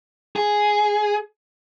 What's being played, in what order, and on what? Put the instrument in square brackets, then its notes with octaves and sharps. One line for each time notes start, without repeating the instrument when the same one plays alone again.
[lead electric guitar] G#4